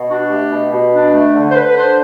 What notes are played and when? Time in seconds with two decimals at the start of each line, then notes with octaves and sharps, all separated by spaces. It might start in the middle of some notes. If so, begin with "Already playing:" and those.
Already playing: B2
0.09 D4 F#4
0.30 A3 G4
0.51 B2
0.71 B2
0.92 D4
1.13 A3
1.34 D3
1.49 C5
1.55 D3 B4
1.67 B4
1.76 D4 C5